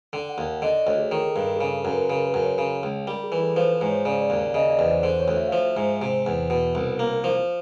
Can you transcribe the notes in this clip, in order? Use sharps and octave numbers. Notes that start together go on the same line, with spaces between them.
D3 G5
F#5
D#2
D3 D#5
D5
D2 C#5
G#4
D#3 G#4
A4
G2
A#4
G#4
C#3 A4
F#2 A#4
B4
A#4
C#3 B4
B4
F#2
C#5
C#3
C#2
G3 A#4
G#4
E3
A4
F3 B4
C5
G#2
C#5
C#3 D5
D5
D#2
D5
C#3 D#5
D5
E2
C5
D3 C5
C#5
D2
E5
F3 F5
E5
G#2
C3 G5
E2
B2
C2
A#3
F3